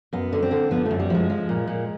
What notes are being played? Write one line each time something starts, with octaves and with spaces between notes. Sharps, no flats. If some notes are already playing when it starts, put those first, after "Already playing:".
F#2 B3
D3
C4
D3
F3 B3
A3
F#2
G3
F3 G#3
F3
A#2
A#2